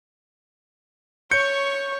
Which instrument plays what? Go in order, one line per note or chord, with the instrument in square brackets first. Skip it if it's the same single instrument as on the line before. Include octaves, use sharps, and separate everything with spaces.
[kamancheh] C#5 C#6 [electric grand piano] G6 C#7